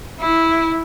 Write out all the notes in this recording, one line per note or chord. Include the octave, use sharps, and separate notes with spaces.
E4